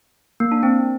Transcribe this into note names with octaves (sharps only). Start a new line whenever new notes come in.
A#3
D4
C4